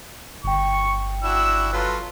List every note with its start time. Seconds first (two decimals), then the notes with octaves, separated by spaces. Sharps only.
0.44 G1 G5 C#6
1.23 D4 E4 F#4 E6
1.73 F#3 F4 A4 B4